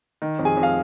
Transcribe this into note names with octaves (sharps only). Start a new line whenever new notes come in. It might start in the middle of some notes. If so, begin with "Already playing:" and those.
D#3
F2
G#4 G#5
F2
F5